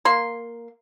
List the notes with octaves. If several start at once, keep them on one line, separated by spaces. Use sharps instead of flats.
A#3 C6